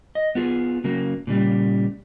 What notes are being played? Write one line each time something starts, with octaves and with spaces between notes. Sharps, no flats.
D#5
B3 F4 G#4
C#3 F#3 A#3
A#2 C#3 G3